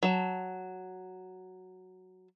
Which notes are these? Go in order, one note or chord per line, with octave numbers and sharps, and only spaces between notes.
F#3 A5